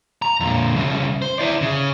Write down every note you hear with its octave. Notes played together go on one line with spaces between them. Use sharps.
A#5
F2 A#2
C2 C#3
C5
E4 D5
C#3